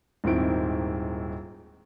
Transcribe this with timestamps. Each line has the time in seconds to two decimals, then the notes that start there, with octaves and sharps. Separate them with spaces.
0.24 D#1 G#2 D#3 C4 E4 D7